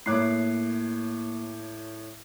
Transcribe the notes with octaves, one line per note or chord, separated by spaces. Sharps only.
A2 A#3 C#5 D6 F#6 C7